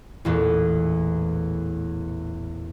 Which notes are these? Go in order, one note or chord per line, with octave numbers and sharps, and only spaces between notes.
A1 E2 A#2